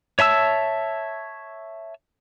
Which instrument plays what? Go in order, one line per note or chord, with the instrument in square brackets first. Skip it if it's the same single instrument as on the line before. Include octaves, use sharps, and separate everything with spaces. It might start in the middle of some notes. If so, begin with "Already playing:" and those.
[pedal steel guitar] C#5 E5 A5 E6